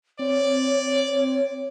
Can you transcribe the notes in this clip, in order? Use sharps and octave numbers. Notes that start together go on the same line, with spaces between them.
C4 C#5 D5